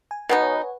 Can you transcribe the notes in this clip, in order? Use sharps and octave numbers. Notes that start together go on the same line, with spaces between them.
G#5
B2 B3 D#4 F#5
C#5
B4